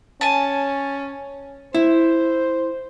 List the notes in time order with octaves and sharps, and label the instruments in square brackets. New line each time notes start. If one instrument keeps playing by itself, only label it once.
[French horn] C#4 [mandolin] G#5 A5
[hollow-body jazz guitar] E4 [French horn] C5